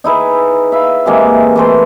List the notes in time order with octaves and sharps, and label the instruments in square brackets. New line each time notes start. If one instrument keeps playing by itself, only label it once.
[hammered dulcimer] D#4 E4 G#4 B4
E5 F5 B5
C3 E3 G#3 A#3
E3 A3 C5